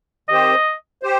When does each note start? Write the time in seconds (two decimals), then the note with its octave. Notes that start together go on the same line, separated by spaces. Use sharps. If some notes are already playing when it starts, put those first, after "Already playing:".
0.29 D#3 C4 G4 C5 D#5
1.03 G4 C5